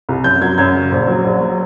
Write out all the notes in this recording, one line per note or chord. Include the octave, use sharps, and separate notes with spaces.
C2
F#2 G6
F#3 G#6
F#2 G#6
C#3
A#1
F#3
A#1
F#3